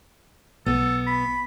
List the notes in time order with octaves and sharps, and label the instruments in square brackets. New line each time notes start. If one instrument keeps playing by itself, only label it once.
[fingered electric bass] B1 [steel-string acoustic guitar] B3 [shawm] A4
[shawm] B5